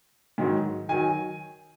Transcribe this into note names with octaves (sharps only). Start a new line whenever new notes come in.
G#2 D#3 F#3
D#3 F#3 G#5